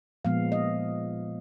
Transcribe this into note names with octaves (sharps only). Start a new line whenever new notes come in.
A#2 F3 G#3 B3 F5
D#5